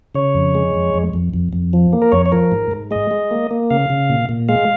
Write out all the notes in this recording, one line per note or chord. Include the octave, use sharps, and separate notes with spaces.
C#3 C#5
F2
G#3
F2
F2
F2
F2
F2
F3
A#3
A#4
F2 C#5
C#5
F3 A#4
G#2
G#2
G#3 D#5
G#3
A#3
A#3
C#3 F5
C#3
A#2
A#2
G#3 F5